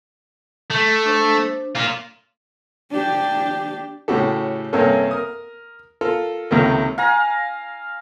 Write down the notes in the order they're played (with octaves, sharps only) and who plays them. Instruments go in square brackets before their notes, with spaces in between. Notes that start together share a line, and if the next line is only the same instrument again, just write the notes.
[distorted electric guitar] A3
[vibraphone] D4 C5
[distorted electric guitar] A#3 F4
[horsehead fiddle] D4 G4
[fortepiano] A2 C#3 F#4 G4 A4
G2 C3 A#3 C#4 A4 A#4
A#4 D#6
F4 A4 A#4
C#2 C3 D#3 A3 A#3
[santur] F5 G#5 A#5